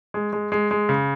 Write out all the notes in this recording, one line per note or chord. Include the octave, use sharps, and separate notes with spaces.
G#3
G#3
G#3
G#3
C#3